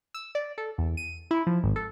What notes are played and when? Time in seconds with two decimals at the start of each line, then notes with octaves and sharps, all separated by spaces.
0.14 E6
0.35 D5
0.58 A4
0.78 E2
0.97 D#7
1.31 E4
1.47 F3
1.64 G#1
1.76 A4